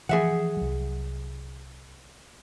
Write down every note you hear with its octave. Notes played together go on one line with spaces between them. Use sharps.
E3 F3 G#4 E5 F#5
C2 F#3